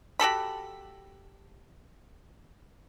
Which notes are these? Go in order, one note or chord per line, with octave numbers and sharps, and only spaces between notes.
F#4 G4 A4 B5